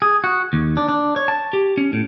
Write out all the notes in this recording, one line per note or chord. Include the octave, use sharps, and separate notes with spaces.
G#4
F#4
D#2
D4
D4
C#5
A5
G4
C#4
A2